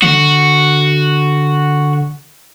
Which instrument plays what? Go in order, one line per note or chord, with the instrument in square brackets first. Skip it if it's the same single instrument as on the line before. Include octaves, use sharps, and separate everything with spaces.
[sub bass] D3 [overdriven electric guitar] F#4